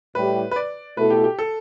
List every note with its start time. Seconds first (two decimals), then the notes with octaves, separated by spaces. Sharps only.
0.15 A2 G3 E4 G4 B4
0.51 B4
0.56 D5
0.96 B2 A3 E4 A4 B4
1.10 G4
1.24 G4
1.39 A4